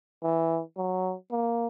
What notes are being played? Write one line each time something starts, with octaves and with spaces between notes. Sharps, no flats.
E3
F#3
A#3